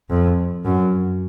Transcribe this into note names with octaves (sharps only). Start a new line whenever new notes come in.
F2
F#2